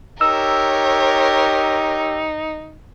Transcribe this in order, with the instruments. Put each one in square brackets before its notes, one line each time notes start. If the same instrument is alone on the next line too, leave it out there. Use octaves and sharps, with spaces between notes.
[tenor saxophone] D#4 [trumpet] G4 [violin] A#4 C#5 [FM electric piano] E6